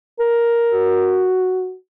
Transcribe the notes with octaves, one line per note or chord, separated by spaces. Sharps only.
A#4
F#4